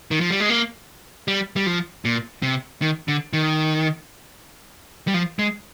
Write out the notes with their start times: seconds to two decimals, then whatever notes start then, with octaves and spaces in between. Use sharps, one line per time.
0.11 D#3
0.21 F3
0.31 G3
0.40 G#3
0.49 A#3
1.28 G3
1.56 G3
1.66 F3
2.05 A#2
2.42 C3
2.82 D#3
3.08 D3
3.33 D#3
5.07 G3
5.14 F3
5.39 G#3